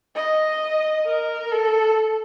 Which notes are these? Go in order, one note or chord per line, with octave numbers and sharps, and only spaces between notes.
D#5
A#4
A4